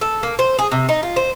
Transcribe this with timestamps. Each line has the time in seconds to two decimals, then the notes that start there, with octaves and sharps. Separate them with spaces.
0.01 A4
0.23 A#3
0.39 C5
0.59 G#4
0.72 C3
0.89 D#4
1.03 F4
1.16 C5